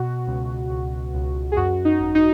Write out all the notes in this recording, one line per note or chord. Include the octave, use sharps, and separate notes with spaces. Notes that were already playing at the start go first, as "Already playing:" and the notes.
Already playing: B2 F#4
C#2
C#2
C#2
G#4
F#2 F#4
D#4
G#1
D#4